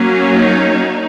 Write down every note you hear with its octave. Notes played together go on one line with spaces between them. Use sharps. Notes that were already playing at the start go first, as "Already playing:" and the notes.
Already playing: F#3 A#3 C#4
D#4